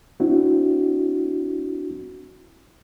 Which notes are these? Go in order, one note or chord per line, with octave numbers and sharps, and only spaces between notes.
C4 D4 E4 F#4